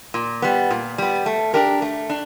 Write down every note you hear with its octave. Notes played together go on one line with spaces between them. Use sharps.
A#2
G3 B3
A#2
G3 B3
A3
D4 G4 A#4
A3
D4